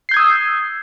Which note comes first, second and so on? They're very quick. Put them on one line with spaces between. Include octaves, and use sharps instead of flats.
C7 G6 G#6 D#6 E6